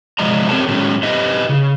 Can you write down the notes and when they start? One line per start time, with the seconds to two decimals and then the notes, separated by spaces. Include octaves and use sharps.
0.19 C3 F3 F#3 G#3 D#5 A#5
0.49 C4 G4 A#4 C#5 G#5 A5
0.68 A2 D#3 F#3 G#3 C#4
1.03 D#4 E4 G4 B4 D#5
1.49 C#3